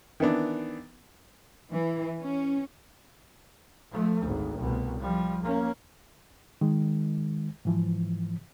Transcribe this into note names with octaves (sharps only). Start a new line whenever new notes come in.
D#3 E3 B3 D4
E3
C#4
F3 A3
G#1 D2
C2 B2
F3 G3
A#3 C#4
D#3 G#3
G#2 E3 F3